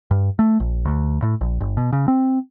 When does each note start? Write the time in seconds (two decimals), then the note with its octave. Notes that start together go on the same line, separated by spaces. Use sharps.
0.11 G2
0.39 A3
0.60 A#1
0.85 D2
1.22 A2
1.41 A#1
1.61 G1
1.77 B2
1.93 C#3
2.08 C4